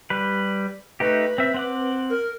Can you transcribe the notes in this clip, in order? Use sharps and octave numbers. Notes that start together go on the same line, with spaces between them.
G3 B4
A3 D#4 G4 B4
C4 E5
C4 F#5 D6
A#4